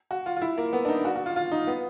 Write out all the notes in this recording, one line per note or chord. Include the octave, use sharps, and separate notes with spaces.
F#4
F4
F4
E4
A#3
B3
D4
D#4
F#4
F#4
F4
F4
D#4
B3